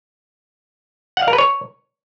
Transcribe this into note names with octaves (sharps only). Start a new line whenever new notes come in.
F#5
F5
A#4
B4
C#5